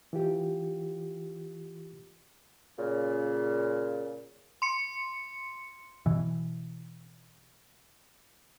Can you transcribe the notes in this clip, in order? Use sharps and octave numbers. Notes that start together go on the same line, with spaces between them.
E3 F4 G4
A#2 C#3
C6 C#7
B2 E3